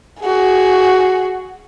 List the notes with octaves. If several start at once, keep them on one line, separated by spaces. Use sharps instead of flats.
F#4 G#4